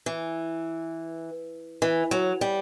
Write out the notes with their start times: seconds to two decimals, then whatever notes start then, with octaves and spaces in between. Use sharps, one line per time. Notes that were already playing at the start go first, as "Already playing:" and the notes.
0.06 E3
1.82 E3
2.11 F#3
2.41 G3